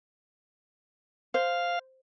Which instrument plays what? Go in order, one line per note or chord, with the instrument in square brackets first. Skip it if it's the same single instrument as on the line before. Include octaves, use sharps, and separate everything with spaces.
[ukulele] C5 [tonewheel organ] F5